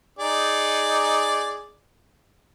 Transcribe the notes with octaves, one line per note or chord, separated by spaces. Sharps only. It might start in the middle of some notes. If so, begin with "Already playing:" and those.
D#4 G#4 D5